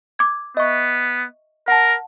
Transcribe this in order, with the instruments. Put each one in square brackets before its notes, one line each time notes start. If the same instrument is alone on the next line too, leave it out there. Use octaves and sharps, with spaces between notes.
[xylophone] D6 G#6
[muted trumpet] B3 [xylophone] D#5 E5 C#6
[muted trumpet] A#4 [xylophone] F#5 A5